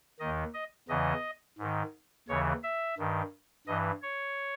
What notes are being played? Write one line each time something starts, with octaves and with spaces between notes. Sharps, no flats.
D#2 D#3 D#5
D#5
E2 C#3 E3 D#5
G#2 D#3
D#2 C#3 E3 C#5
E5
G2 D#3
G2 E3 D#5
C#5